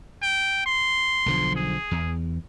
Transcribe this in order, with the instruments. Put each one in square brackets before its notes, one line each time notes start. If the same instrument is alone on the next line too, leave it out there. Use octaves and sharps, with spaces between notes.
[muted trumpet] G5
C6
[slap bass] B1 D3 F3
[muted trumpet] G#4
[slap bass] E2